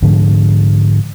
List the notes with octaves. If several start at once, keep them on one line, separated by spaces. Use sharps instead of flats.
G#2 D3 F3